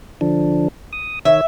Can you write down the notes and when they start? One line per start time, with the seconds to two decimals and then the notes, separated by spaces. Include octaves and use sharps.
0.21 D3 F3 D4
0.93 D#6
1.25 D#3 C#5 E5